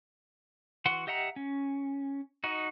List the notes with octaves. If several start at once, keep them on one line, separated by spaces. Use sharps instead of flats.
E3 F#4 F#5 C6
G4 D#5 E5 F#5 A#5
C#4
D#4 F#4 D#5